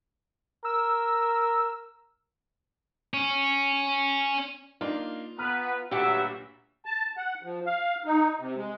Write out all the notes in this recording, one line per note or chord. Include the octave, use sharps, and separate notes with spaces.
A#4 E6
C#4
A#3 D4 D#4 F4
B3 B4 A#5 F6
D2 G2 A#2 F#3 G4 B4 E5 F#5
A5
F#5
F3
F5
D#4
C3
G#3